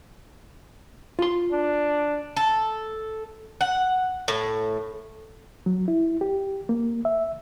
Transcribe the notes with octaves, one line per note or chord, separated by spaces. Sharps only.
F4 C6
D4
A4
F#5
A2
F#3
E4
G4
A#3
E5